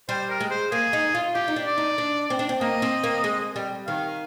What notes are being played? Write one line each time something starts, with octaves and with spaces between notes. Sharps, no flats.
G3 C5
A#4
G#3
C5
A#3 G#4
D#4
F4
F4 G4
D#4
D4
D5
D#4
D4
C4
D4
C4
A#3 D#5
C4
A#3
G#3
G3
D#3 F5